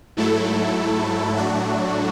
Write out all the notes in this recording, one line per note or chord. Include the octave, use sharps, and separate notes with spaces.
G#2 F#3 A3 E4 A4
A2 F#3 A3 D4 F#4